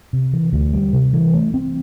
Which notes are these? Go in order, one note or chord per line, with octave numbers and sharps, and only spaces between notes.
C3
E3
D2
G3
C3
E3
A3
C4